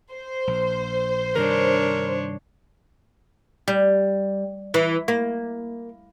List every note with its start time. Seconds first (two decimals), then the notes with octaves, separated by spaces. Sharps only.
0.12 C5
0.47 A#1
1.36 G2 C3 D#3 D4 A#4 C#5
3.68 G3
4.74 E3
5.08 A#3